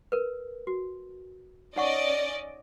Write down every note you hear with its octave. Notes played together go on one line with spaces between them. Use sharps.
A#4 B4
F#4
C#4 D#4 D5 D#5 F#5 C#6